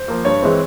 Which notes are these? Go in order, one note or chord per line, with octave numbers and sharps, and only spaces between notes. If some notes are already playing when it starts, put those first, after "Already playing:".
Already playing: C5
F3 A#3
G2 C#5
E3 G#3 C4